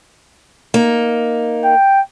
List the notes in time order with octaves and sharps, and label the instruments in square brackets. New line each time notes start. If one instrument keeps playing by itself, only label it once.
[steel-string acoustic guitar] A#3 D#4
[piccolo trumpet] G5